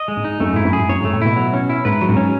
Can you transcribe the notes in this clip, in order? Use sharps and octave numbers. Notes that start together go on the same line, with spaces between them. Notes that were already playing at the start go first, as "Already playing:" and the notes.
Already playing: D#5
G#3
G#2
D#4
F#2 A3
G#2 E4
F#2
G#2 G#4
F#2 C#5
G#2 A3
A2
B2 E4
F#3
C#4
E4
G#2 B4
F#3
G#2
C#4